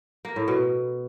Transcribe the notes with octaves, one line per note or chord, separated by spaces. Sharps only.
A#3
A2
B2